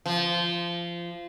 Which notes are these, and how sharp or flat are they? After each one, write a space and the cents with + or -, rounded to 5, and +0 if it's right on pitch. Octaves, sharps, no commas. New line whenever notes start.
F3 -20